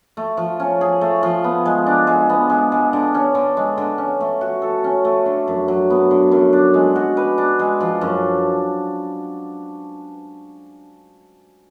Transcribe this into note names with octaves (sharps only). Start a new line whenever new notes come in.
A3
F3
C#4
G#4
A3
F3
B3
G#3
D4
G#3
B3
G#3
G#3
D3
C#4
D3
G#3
D3
C#4
A3
F#4
A4
C#4
A3
D3
F#2
F#3
B3
D3
F#2
D4
G#3
F#4
B4
D4
G#3
F3
F#2